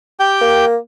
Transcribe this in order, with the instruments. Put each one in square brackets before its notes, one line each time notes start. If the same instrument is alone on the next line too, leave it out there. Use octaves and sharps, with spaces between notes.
[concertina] G4 G5
[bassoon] A#3